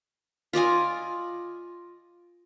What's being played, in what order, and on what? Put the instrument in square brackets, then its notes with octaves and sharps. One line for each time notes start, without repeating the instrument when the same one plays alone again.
[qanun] F4 D5 D#5 G#5